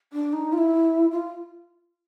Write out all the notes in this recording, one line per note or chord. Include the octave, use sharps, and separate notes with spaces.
D4
D#4
F4
E4
F4